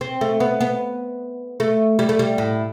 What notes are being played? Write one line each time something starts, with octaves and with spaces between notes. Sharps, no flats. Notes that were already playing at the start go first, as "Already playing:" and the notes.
C4
A3
B3
B3
A3
G3
A3
G3
A2